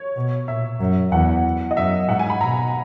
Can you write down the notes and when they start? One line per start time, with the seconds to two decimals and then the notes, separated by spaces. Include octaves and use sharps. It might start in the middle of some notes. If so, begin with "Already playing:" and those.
Already playing: C#5
0.16 B2
0.47 A#2 E5
0.81 F#2
1.12 E2 F#5
1.71 D#5
1.77 F#2 E5
2.09 G#2 F#5
2.19 G#5
2.30 B5
2.41 B2 A#5